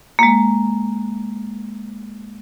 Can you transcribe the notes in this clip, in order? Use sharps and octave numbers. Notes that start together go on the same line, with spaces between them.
G#3 A#3